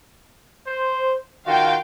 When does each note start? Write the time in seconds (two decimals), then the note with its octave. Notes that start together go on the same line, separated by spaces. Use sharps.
0.67 C5
1.47 D#3 F4 F#4 F5 G5